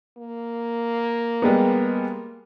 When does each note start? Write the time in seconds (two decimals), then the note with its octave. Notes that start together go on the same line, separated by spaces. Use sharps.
0.18 A#3
1.42 G3 G#3 B3